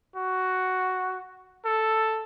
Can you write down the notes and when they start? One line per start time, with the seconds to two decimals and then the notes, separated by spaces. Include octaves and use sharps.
0.16 F#4
1.65 A4